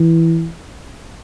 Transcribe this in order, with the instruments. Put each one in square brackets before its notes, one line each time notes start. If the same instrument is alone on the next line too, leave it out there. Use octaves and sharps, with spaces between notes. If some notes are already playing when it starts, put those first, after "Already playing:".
Already playing: [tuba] E3